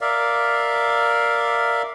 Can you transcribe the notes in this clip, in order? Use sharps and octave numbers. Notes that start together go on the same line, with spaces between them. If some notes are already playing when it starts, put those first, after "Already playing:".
A#4 D5 E5 F5